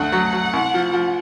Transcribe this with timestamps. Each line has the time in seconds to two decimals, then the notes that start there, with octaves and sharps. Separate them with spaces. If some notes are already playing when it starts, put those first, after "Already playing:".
Already playing: D2 F#5
0.12 F#3
0.33 F#3
0.53 C2
0.74 F3
0.93 F3